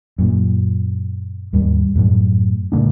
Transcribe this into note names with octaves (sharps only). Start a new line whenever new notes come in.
F#2 A#2
D#2 G#2 G3
F#2 A2 F#3
A2 C#3 A3 D4